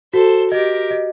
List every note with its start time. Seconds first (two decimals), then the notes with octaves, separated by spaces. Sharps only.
0.13 F#4 A4 C5
0.52 G4 A#4 D#5
0.91 D#5